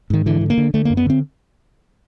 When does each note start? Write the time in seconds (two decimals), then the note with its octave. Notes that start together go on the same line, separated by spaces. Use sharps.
0.10 G#2 D#3
0.26 D3 E3
0.41 D3
0.50 A#3
0.58 D3
0.74 D3 A3
0.85 A#3
0.90 F#2
0.97 B3
1.06 D3 C4